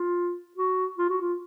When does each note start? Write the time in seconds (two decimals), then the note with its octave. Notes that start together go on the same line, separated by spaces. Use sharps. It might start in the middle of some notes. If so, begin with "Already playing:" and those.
Already playing: F4
0.57 F#4
0.98 F4
1.09 F#4
1.21 F4